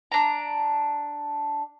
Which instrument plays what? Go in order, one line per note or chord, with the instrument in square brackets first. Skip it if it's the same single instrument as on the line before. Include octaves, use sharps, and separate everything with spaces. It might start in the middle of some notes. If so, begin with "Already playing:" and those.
[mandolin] D4 A#5